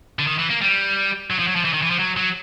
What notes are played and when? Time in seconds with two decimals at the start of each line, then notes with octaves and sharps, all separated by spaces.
0.19 D3
0.27 D#3
0.39 E3
0.50 A#3
0.62 G3
1.30 F#3
1.39 F3
1.48 F#3
1.56 F3
1.65 E3
1.74 D#3
1.82 E3
1.91 F3
1.99 F#3
2.17 F#3